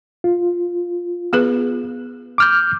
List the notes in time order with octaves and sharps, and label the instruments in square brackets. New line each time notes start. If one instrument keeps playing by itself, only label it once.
[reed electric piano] F4
[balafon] B3 G#4 B4
[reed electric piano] D6 F6 G6